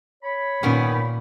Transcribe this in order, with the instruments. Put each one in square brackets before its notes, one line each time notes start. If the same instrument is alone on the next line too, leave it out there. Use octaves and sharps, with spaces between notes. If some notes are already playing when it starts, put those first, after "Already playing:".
[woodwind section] C#5 B5
[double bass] A#2 [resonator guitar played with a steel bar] D#3 B3 C#4